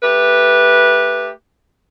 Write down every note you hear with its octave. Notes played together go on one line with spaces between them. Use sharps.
A3 G4 B4